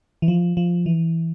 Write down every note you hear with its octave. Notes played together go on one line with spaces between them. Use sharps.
E3
F3
F3
E3